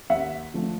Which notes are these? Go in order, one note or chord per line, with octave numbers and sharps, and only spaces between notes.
D#2 E5 F#5
D3 F3 A3